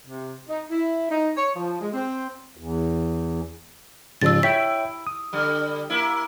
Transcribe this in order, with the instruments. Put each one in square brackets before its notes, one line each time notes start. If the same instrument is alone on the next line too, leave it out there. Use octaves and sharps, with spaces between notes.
[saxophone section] C3
D#4
E4
D#4
C#5
F3
G#3
C4
[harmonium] E2
[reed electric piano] G#2 C#3 F3 [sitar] G3 [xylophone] E6 A6
[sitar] E4 [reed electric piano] C#5 E5 G5 [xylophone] B6
[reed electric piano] D#6
[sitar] D3 G3
A#3 E4